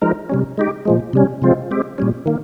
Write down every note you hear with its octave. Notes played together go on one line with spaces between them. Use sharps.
F3 G#3 D#4 A#4
C3 G3 C#4
G#3 D#4 G4
A#2 F3 G#3
C3 G3 C#4
C3 F3 G#3 C4 F4
G#3 C4 G4
A#2 G3 C#4
D#3 A#3